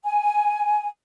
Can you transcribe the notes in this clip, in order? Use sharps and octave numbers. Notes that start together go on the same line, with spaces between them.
G#5